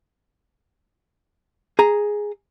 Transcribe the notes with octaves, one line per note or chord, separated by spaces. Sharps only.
G#4 A#5